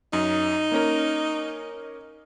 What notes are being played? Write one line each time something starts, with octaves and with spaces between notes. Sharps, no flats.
F#2 D#4
A#3 C#4 A#4